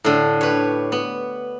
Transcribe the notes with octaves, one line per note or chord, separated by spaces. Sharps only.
A2 D3
G4 B4 C#5
B3